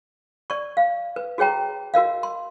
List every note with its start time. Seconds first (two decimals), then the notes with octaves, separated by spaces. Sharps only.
0.50 D5 C#6
0.77 F5
1.16 B4
1.38 F#4 G#4 C#5 G5 A#5
1.94 F#4 A#4 D#5 F5
2.23 C6